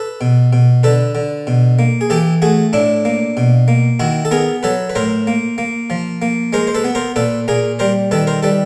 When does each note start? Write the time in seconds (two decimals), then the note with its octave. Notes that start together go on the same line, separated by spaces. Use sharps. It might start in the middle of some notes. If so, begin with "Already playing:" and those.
Already playing: A4 B4
0.21 B2
0.53 B2
0.83 D3 A4 B4
1.15 D3
1.47 B2
1.79 A#3
2.01 G#4
2.10 E3 G4 A4
2.42 A3 F#4 G#4
2.73 A2 D4 E4
3.05 A#3
3.37 B2
3.68 A#3
4.00 D#3 E4 F#4
4.25 A4
4.31 B3 G#4 A#4
4.63 F#3 A4 B4
4.90 B4
4.95 A2 A#4 C5
5.27 A#3
5.58 A#3
5.90 F3
6.22 A#3
6.53 G#3 A#4 C5
6.67 C5
6.75 A4 B4
6.84 B3
6.95 A#4 C5
7.16 A#2 A4 B4
7.48 A#2 G#4 A#4
7.79 G3 A#4 C5
8.11 D#3 A4 B4
8.27 A#4 C5
8.43 G3 A4 B4